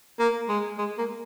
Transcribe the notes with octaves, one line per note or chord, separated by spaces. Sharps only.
A#3
G#3
G#3
A#3